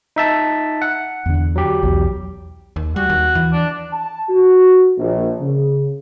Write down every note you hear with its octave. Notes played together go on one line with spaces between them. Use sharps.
D#4 E5 A5
F#5
E2 D3
F#3 G4
B1 E2
D#2
G3 F#4
D#2
E3
D4
A5
F#4
A#1
C#3